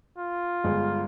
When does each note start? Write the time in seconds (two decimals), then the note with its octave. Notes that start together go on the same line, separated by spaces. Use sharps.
0.18 F4
0.64 G1 G#3